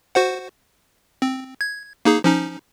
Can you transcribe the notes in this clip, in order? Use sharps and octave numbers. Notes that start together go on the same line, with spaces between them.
F#4 C5 F#5
C4
G#6
A#3 D#4 G#4
F3 C#4 D#4